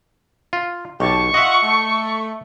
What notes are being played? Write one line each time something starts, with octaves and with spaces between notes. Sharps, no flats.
F4
B1 G4 A5 C#6
F4 D#5 E5 F#5
A3